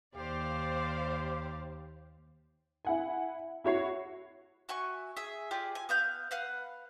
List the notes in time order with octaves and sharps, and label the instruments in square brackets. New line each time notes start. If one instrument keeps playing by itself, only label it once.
[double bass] D#2 [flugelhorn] G4 [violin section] C5 D5 F5
[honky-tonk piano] E4 F#5 G#5
E4 F#4 C#5 C7
[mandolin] F#4 E5 G#5 C#6
G#4 E5
F4 G4 G#4 D5
G#5
B3 F5 G6
B4 F5 F#5